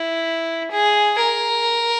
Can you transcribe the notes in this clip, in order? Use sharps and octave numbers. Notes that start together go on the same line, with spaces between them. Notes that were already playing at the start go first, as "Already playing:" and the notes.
Already playing: E4
G#4
A#4